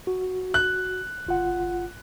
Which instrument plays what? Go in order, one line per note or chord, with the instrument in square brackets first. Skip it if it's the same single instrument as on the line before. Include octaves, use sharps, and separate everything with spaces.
[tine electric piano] F#4
[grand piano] F#6
[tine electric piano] G1 F4 F#5